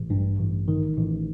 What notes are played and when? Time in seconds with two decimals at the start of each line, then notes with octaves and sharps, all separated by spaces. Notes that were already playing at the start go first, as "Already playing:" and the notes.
Already playing: A1
0.10 G2
0.39 A1
0.68 D#3
0.96 A1